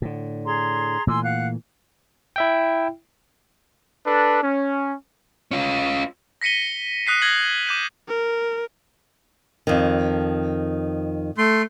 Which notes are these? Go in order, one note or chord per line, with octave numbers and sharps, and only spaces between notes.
A2 D3
G#4 A#5 C6
A#2 E3 A3 G#5 C6 E6
F5 F#5 F#6
E4 E5 G5
D4 A4 B4
C#4
C#4 F4
A#6 B6 C#7 D#7 G7
D#6 F#6 B6 C7 D#7
F6 G#6 A#6 C7 F#7
D6 G6 D#7
A#4
F2 D#3
A3 C6